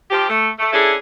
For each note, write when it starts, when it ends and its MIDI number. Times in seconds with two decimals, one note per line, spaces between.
0.11 0.29 53
0.11 0.29 67
0.29 0.49 57
0.59 0.72 57
0.73 0.95 61
0.73 0.95 62
0.73 0.95 64
0.73 0.95 68
0.73 0.95 69